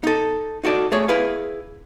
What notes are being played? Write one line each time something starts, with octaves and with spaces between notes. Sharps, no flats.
D#4 A4
D#4 F#4 A4 D5
A3 G#4 C#5
E4 G#4 B4 F5